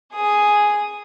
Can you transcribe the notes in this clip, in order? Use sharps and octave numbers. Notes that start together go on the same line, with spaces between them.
G#4 D#6